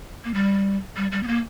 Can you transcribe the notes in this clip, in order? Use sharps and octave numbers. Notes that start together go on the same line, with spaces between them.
A#3
G3
G3
G3
B3
A#3